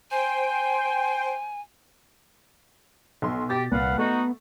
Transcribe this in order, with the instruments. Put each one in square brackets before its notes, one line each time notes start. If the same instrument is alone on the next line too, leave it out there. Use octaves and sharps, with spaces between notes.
[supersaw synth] C5 G5 [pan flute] G#5
[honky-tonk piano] B1 C6 [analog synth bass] B2
[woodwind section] G4 [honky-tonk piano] A6
[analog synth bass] C2 [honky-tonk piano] A#2 [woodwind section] B4 F5 F#5
[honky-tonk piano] A3 [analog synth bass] B3 [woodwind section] D#4 F#4